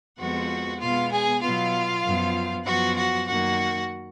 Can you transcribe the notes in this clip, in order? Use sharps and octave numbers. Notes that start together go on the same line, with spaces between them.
F2 F3 G#3 B3 F#4 F#5
B2 G#3 B3 F4 F5
G#4 G#5
B2 F#3 B3 F4 F5
F#2 F3 B3
F#2 F3 B3 F#4 F#5
F#4 F#5
F#2 D#3 A#3 F#4 F#5